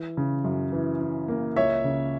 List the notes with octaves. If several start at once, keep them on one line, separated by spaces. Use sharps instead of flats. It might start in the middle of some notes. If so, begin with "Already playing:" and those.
Already playing: E3
C#3
F#2
E3
E3
A#3
C#2 C#5 E5
C#3